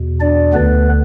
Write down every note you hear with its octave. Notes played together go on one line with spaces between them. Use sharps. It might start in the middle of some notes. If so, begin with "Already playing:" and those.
Already playing: E2 B2
D4 D5
D2 D3 B3 B4